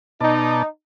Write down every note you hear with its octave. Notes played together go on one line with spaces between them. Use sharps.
B2 D#4 D5 A5